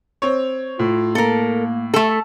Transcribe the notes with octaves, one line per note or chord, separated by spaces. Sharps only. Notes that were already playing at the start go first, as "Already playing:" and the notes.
C4 C#5
A2 F4
A#3 A4 A#4
A3 A4
E5